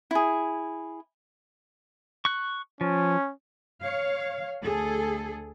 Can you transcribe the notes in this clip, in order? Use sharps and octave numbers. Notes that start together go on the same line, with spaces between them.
E4 G#4
C#6 F#6
F3 C#4
C#5 F5
D2 G#4 A4